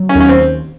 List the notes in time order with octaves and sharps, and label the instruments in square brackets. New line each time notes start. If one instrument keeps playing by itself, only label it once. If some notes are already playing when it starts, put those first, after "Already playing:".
Already playing: [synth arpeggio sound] F#3
[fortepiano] C#4
[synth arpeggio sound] D#2
[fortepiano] C#4
C4